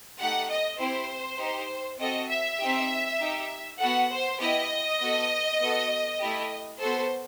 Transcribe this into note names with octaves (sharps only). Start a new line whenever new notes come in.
A3 D#4 G4 F#5
D#5
C4 E4 G4 C5
D#4 G4
C4 F#4 A4 D#5
E5
C4 D#4 G4
D#4 G4
B3 F#4 A4 F#5
C5
B3 E4 G4 D#5
B3 F#4 A4
B3 F#4 A4
A3 E4 G4
B3 F#4 A4 C5